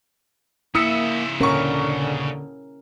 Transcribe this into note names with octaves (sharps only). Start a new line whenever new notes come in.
C#3 A#3 E4 E5 D#6 E6 C#7
D#1 D3 C#4 A#4 C#6